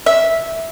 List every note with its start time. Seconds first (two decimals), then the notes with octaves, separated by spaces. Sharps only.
0.06 E5